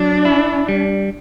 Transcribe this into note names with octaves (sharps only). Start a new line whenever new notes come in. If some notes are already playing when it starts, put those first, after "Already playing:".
Already playing: F#3 D4
E4
G3